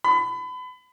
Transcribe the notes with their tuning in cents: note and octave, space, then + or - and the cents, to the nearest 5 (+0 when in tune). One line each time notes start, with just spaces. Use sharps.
B5 +30